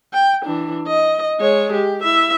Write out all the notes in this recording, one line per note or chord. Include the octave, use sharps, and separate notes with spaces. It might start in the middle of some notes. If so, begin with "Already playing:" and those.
G5
E3 D4
D#5
G#3 C#5
G4
E4 E5